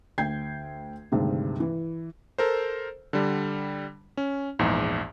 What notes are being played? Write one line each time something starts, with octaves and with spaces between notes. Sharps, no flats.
D2 G5 G6 G#6 C7
D2 G2 C3 D#3 G#3
E3
A4 A#4 C5
D3 G3
C#4
A#1 E2 G#2